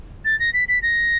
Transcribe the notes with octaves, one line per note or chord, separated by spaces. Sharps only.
A6
A#6
B6
B6
A#6